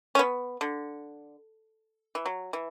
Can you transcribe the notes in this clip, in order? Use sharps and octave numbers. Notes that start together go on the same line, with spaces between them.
C#4
B3
D3
E3
F#3
E3